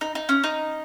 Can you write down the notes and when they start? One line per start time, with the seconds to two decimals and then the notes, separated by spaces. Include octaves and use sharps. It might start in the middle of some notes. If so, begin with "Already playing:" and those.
0.01 D#4
0.15 D#4
0.29 C#4
0.44 D#4